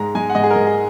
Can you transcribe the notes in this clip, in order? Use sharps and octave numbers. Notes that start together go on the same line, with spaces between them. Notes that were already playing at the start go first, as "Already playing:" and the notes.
Already playing: G#2 G#3 A#5
G#3 G#5
F#5
G#2 D#5
G#4
A#4
G#2
G#4